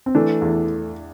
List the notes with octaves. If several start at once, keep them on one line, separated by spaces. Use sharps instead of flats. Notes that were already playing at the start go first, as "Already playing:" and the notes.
C4
E3 A3 D4
E2